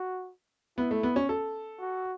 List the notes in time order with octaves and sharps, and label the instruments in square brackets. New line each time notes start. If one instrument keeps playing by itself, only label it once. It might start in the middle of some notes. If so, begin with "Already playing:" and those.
Already playing: [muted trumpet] F#4
[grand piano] B3 [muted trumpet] E4
[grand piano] A3
B3
C#4
A4
[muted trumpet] F#4